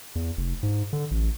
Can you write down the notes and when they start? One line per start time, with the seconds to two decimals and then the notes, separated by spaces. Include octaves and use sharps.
0.15 E2
0.37 F1
0.63 G#2
0.93 D3
1.11 A1